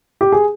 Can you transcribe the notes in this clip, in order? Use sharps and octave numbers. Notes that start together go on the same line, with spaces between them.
G4
G#4